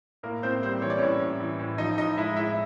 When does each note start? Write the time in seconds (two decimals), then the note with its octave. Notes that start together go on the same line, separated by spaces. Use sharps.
0.23 A2 A#3 A#4
0.43 A2 C4 C5
0.62 G3 C4 C5
0.82 E3 C#5
0.90 D5
0.98 A2 C#4 C#5
1.20 A2
1.40 E3
1.59 A2
1.78 F3 D#4 D#5
1.98 A2 D#4 D#5
2.17 G#3 E4 E5
2.36 A2 E4 E5